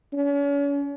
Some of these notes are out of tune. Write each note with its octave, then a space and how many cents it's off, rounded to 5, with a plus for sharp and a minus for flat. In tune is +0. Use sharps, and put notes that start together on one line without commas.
C#4 +40